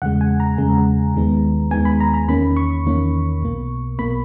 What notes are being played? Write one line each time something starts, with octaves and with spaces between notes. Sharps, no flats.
E2 C#3 G#3 F#5
G#5
A#5
E2 C#3 G#3
D#2 D#3 G#3 B3
D#2 D#3 G#3 B3 G#5
B5
A#5
A#5
E2 D#3 A#3 C#4 B5
C#6
E2 D#3 A#3 C#4
B1 B2 A#3
B1 B2 A#3 B5